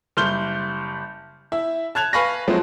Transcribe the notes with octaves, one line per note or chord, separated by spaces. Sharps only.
F#1 G3 C6 F6 G6 G7
E4 E5
A5 F#6 G#6 F7
B4 F5 G#5 B5 C#6 A#6
F3 F#3 G#3 A3 C4